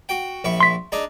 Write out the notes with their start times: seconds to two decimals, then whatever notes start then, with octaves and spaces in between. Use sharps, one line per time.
0.09 F#4 G5
0.44 A#1 E4 C#6
0.60 C6 B6
0.92 D4 D#4 G#4